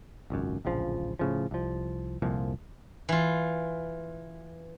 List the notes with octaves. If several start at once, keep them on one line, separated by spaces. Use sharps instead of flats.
G#1 C#2 F#2
D1 A#1 C#3 F3
A2 C#3 F3
C2 F3
C2 F2 A#2 F3
E3 F4